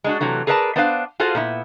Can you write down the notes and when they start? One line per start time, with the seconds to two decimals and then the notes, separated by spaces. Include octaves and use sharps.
0.04 G#3 D4 F#4
0.20 C3 E3 F#3 A3
0.47 G#4 A#4 B4 D5 F#5 A5
0.76 B3 D4 B4 C5 D#5 F5
1.20 F4 F#4 G#4 A4 C5 F5
1.35 A#2 B3 E4